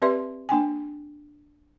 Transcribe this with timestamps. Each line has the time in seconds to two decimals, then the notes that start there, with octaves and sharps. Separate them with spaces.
0.02 C4 G4 B4 D5 E5 C6
0.49 A#3 D4 G5 G#5